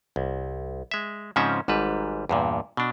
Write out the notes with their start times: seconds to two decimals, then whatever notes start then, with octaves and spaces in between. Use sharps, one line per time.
0.16 C2
0.91 G#3 E5
1.36 G#2 C#3 F3 C4 C#4 E5
1.68 G#1 G#2 G3 B4
2.29 E2 G2 A#2
2.77 B2 D4